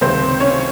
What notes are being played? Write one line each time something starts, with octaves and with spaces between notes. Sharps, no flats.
C#2 C3 D#3 C4 C5
C#4 C#5